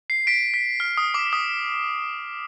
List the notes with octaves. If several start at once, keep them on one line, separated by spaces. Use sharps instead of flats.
C7
B6 D7
B6
F6
D#6
D6
D#6